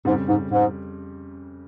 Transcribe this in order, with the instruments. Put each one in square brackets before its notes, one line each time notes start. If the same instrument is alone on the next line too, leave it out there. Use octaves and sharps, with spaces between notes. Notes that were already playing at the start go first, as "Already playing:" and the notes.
[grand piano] F2 C#3 G3 [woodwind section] G#2
[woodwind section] G#2
G#2